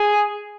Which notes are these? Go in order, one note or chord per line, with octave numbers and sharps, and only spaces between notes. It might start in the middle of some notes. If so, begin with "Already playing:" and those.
Already playing: G#4